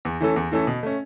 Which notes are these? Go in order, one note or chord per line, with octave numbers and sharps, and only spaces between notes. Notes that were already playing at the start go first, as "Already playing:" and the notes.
E2
E3 A3 C#4 A4
E2
E3 A3 C#4 A4
B2
A3 C#4